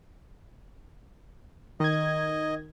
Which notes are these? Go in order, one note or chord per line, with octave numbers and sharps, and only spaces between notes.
D#3 D#5 G#6